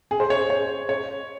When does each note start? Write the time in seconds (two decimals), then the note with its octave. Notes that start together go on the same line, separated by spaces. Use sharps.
0.11 G#4
0.20 C5
0.30 C#5
0.50 C#5
0.89 C#5